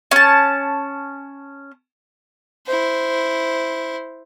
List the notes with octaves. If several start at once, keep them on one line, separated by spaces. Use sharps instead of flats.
C#4 A5
E4 C5